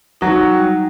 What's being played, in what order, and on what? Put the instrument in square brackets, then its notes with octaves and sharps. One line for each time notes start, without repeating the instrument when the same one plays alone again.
[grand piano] F#3 F#4 [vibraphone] D#4
[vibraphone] G3